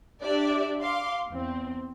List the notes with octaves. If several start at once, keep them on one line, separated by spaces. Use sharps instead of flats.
D4 G4 D5 E5
F5 C6 D6
E2 C4